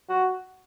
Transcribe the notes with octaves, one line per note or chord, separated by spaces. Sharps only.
F#4